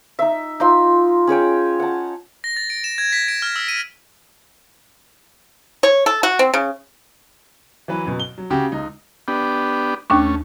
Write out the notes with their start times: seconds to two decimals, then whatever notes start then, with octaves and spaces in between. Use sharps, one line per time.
0.19 D#4 E5
0.60 D#4 F4 C6 E6
1.27 C#4 G#4 C#5 G5
1.80 F#5 A5
2.44 A#6
2.57 A6
2.70 D7
2.84 E7
2.98 G#6
3.12 B6
3.28 D7
3.42 F6
3.56 E6
3.68 D#7
5.83 C#5
6.06 A4
6.23 F#4
6.39 C4
6.54 C#3
7.88 E3 F#3 B4
8.05 F#2 B2
8.20 G7
8.38 F#3
8.50 C#3 F#4 G4
8.72 C#2 D#4
9.28 B3 D4 G4
10.10 D#2 A3 C#4 D4 C#6